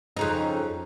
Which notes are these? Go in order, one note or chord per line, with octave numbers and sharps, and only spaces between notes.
F2 C#3 D#4